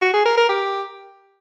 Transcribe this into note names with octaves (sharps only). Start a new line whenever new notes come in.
F#4
G#4
A#4
A#4
G4